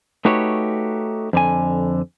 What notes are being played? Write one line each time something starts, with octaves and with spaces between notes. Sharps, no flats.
A3 D#4 F#4 G4 B4 C#5
F2 D3 G#5